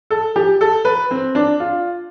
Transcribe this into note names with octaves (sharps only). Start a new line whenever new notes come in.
A4
G4
A4
B4
C4
D4
F4